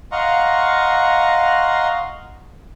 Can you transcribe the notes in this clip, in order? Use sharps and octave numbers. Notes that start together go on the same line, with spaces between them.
D#5 F5 F#5 A#5 C6 C#6